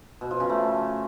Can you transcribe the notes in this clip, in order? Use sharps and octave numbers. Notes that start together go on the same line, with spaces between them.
B2
F3
C#3
A3